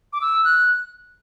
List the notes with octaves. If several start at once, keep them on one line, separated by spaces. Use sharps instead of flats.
D6
E6
F#6